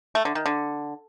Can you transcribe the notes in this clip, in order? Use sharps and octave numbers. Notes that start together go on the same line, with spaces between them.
A3
D3
D#3
D3